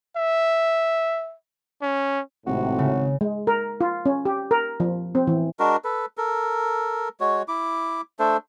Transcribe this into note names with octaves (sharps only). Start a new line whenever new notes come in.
E5
C#4
G#1 A2 C3 F#4
C#3
G#3
A#4
F4
C#4
G4
A#4
F3
C4
E3
G#3 D4 F#4 A#4
A4 B4
A4 A#4
G#3 F#4 C#5
E4 D6
A3 D4 A4 C5